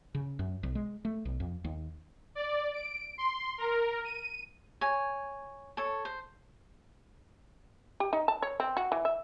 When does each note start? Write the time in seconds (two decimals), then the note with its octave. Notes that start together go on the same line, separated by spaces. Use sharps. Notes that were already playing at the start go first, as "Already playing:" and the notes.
0.15 C#3
0.39 F#2
0.63 B1
0.75 G#3
1.05 A3
1.25 B1
1.40 F2
1.64 D#2
2.35 D5
2.73 D7
3.18 C6
3.58 A#4
4.04 D#7
4.81 C#5 G#5
5.77 A4 C#5
6.05 C5
8.00 G4
8.13 D#4
8.28 A5
8.42 C#5
8.60 C4
8.77 F#4
8.92 E3
9.05 E5